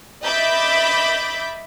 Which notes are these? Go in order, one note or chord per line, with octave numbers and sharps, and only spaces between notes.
D#5 E5 B5 D6 G6 A6